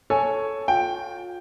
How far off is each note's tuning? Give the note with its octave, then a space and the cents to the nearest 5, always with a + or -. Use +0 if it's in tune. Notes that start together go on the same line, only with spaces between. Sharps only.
A4 +0 C#5 +0 G#5 +0
F4 +35 G5 +0